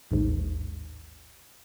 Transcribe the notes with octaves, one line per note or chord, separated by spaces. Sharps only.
A1 D#2 G#2